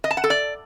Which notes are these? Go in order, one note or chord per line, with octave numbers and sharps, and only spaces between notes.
D#5
A5
F#5
A4
D5